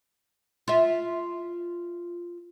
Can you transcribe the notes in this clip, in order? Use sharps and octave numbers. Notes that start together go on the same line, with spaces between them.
F4 E5